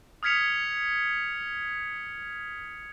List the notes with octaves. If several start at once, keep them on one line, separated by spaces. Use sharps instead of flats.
D#6 F6 G#6 B6 C#7 F7